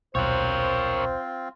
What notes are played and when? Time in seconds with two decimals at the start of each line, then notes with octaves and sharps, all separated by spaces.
0.15 D#1 B1 C4 F4 A#4 C5 C#5